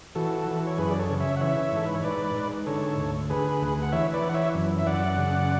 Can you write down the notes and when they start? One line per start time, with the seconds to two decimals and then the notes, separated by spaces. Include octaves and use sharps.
0.15 E3 F#4 A4
0.47 E3
0.67 C#5
0.78 F#2 G#4 B4
0.90 D5
0.99 A4 C#5
1.10 C#3
1.20 C#5 E5
1.37 F#5
1.41 E3 C#5 E5
1.72 G#2 A4
1.86 B4
1.95 C#5
2.04 G#2 B4 D5
2.35 G#2
2.66 D3 A4 C#5
2.98 D2
3.30 D3 G#4 B4
3.61 D2
3.82 F#5
3.92 E3 C#5 E5
4.13 B4 D5
4.23 E3
4.29 F#5
4.34 C#5 E5
4.55 F#2
4.79 E5
4.87 F#2 D5 F#5
5.18 C#3